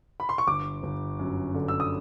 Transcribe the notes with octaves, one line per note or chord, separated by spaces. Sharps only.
B5
C6
C#6
G1 D6
G1
F#2
D3
E6
D#6